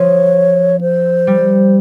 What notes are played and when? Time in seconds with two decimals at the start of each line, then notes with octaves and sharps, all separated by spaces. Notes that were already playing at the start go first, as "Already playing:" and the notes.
Already playing: F3 C#5
0.81 C5
1.27 G3